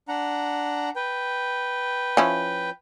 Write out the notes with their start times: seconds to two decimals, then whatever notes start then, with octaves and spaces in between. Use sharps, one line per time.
0.08 D4 F#5 A#5
0.96 B4 G5
2.17 F3 C#4 E4